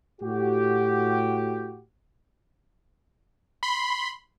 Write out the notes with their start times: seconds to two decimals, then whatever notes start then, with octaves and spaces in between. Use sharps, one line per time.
0.21 A2 F#4 G4
3.63 B5 C6